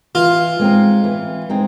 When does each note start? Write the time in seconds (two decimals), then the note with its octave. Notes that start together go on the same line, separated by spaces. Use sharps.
0.15 E3 F4
0.60 G#3 C4 D#4
1.04 E3
1.50 G#3 C4 D#4